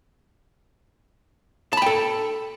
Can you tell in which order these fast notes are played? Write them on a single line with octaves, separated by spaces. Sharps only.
A5 B5 G5 A4